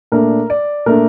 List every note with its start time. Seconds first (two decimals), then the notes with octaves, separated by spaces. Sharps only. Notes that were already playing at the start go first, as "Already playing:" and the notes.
0.12 A#2 A3 D4 A#4
0.50 D5
0.86 A#2 A3 D4 A#4